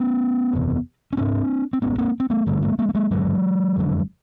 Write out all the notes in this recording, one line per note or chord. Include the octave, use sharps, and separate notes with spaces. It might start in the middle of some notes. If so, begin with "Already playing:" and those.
Already playing: B3 C#4
F#1 E2 C3
C#4
G#1 G#2 C4 D4
C4
G#1 G#2 B3 C#4
A#3 C4
C4
A3 B3
G#1 G2 D3 G3 A3
G#3 A#3
G#3 A#3
B3
G#3 A#3
G#1 G2 D3 F#3 G#3
F#1 F2 D3